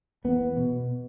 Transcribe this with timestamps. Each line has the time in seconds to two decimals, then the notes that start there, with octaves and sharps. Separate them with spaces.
0.24 E2 B3
0.56 B2